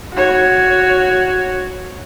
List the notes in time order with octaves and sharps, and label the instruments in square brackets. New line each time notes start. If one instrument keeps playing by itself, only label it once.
[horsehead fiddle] F#4 C#5